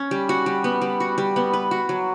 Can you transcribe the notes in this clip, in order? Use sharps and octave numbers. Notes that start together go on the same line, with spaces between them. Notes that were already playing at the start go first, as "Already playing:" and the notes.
Already playing: C#4
G3
F#4
G3
B3
G3
F#4
G3
B3
B4
F#4
F#3